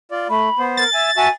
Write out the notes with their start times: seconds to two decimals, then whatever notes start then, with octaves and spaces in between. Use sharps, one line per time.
0.11 F4 D5
0.30 A3 B5
0.59 B3 C5
0.77 A#4 A6
0.93 E5 G#5
1.17 F#4 E5 G#5 A5